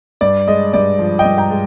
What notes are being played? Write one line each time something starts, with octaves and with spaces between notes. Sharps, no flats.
G2 D5
G#3 D#5
G2 D5
F3
D#5 G5
G2
G5 A#5
G#3